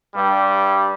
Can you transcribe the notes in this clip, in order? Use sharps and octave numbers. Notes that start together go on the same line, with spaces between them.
G2 G3